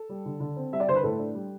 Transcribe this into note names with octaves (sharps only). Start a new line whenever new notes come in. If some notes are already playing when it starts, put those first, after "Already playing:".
Already playing: A4
G3
D3
D3
C4
G3 E5
D5
D3 C5
B4
A2 A4
D4
G3